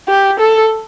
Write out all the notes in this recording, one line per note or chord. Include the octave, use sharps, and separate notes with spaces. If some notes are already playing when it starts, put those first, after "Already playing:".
G4
A4